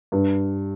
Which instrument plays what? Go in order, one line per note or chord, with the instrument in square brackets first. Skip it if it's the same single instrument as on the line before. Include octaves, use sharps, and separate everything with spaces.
[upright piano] G2